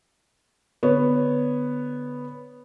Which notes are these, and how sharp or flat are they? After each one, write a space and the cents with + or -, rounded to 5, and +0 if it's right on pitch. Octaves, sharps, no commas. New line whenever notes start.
D3 +0 B3 +0 C#5 +0